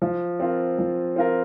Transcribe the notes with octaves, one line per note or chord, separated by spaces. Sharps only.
F3
C4 F4 A#4
F3
C4 F4 A#4